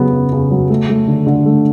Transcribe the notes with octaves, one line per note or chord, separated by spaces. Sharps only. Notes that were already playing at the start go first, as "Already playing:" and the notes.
Already playing: C#3 F#3 B3
C#3
C#3
F#3
A3
A3
D3
D3
A3